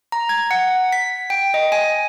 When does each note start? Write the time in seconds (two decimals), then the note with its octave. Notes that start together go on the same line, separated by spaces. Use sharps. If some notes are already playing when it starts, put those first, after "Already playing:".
0.12 A#5
0.29 G#6
0.51 F#5
0.93 B6
1.30 G5
1.54 D#5
1.72 G#5